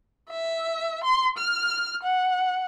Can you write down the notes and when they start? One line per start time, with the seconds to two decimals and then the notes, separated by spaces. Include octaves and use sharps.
0.30 E5
1.04 C6
1.38 F6
2.03 F#5